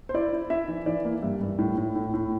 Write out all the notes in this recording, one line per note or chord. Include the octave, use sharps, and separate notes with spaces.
C5
E4 D5
E4
E4 E5
E3
E3 D5
A#3
G2 E5
G2
A2
A2
A2
A2